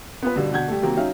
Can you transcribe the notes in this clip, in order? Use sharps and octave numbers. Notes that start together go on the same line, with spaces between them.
B3 F4 B4
G2 B2 D3
B2 D3 F#5 G6 G#6
G3 A3
C3 D#3 F#3 A#3 C4
F#3 C#4 D#4 E5 F5